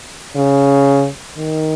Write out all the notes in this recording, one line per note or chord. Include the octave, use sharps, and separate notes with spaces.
C#3
D#3